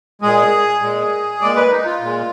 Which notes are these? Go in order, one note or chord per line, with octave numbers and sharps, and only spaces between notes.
A#2 G#3 G#4
A#2 G#3
A#2 G#3 D5
B4
D#4
F4
A#2 G#3